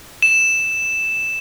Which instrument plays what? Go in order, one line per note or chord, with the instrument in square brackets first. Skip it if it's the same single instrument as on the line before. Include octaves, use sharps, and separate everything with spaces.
[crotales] E7